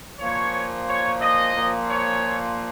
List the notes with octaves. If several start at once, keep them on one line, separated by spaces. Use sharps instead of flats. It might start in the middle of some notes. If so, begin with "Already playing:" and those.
A#2 F3 C#5
C#5
D#5
A#2 F3
C#5